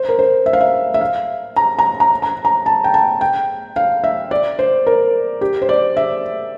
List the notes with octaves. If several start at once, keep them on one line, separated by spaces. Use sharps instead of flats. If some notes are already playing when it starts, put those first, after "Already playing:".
Already playing: C5
A#4
C5
E5
F5
E5
E5
F5
A#5
A#5
A#5
A#5
A#5
A5
G5
A5
G5
F5
E5
D5
C5
A#4
G4
C5
D5
E5